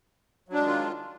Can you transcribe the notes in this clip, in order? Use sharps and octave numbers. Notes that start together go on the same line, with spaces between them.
D#3 F#3 G#3 D4 F4